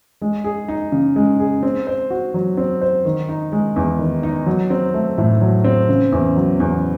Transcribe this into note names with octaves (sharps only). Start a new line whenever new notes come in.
G#3
G#4
D#4
C#3
G#3
G#4
C4
C5
F#4
F#3
C4
C5
D#3
D#4
G#3
E2
D#3
D#4
F#3
C4
A3
A2
F#3
C4
C#3
E2
F#3
E2